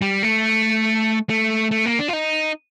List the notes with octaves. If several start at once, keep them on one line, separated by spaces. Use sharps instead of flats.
G3
A3
A3
A3
A#3
D4
F4
D#4